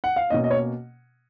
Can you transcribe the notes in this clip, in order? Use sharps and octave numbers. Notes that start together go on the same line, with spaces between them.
F#5
F5
B2 A#3 C#4 D#5
D#5
C#5